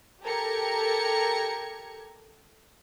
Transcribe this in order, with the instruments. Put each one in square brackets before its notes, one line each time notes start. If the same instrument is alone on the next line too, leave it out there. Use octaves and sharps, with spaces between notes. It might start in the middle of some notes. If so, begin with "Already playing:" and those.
[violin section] G4 A4 A#4 A#5 G#6 C#7